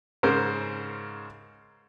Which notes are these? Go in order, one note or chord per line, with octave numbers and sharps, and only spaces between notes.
G#2 C#3 A#4 C5